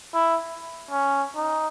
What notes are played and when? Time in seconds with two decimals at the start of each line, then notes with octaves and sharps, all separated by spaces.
0.14 E4
0.91 C#4
1.36 D#4